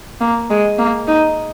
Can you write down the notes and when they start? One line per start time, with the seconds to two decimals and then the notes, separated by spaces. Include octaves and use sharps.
0.21 A#3
0.50 G#3
0.79 A#3
1.08 D#4